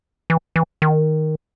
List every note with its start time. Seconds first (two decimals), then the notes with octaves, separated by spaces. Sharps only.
0.30 E3
0.56 E3
0.82 D#3